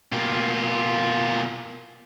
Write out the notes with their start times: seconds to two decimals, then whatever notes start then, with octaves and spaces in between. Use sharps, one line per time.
0.13 B2 A#3 F4 G4